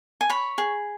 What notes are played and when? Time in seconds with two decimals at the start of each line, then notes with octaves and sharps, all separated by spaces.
0.21 G#5
0.30 C#5 B5
0.58 G#4